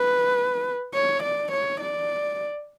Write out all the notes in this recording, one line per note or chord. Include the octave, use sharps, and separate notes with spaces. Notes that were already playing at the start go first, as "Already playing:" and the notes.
Already playing: B4
C#5
D5
C#5
D5